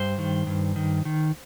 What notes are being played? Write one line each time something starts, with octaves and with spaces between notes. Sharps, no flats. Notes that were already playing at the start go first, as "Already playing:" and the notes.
Already playing: G2 C5
D#3
G2
D#3
D#3